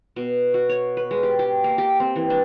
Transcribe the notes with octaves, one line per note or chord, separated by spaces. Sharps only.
B2
F#4
C#5
B4
G#3
G4
G4
A#3
G4
C4
E3
D4